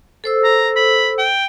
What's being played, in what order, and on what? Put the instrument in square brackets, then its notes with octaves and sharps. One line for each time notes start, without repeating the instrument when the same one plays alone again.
[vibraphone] A4 C5 E6
[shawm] A#5
B5
G5